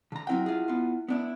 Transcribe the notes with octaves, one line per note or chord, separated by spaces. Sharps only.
D3 A#5
F#3 C4 E4 F#5 G5
F4 G#4
B3 F4
B3 D4 E4